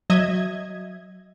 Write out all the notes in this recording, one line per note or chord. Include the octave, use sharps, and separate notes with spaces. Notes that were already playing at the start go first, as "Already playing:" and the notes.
F#3 D#5 E5 G#6